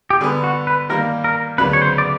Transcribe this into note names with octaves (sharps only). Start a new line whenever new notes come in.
G4
D3 G3 B3 G#4
F#4
B4
D#3 G3 A#3 A#4
A#4
D2 C#3 F#3 B3 D4 B4
C#5
C5
D5